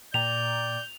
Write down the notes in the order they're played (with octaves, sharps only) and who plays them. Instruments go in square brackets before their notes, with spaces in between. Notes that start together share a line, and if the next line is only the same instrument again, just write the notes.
[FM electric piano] A#2 G5 A#5 [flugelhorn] D5 [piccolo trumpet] G6 [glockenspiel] F7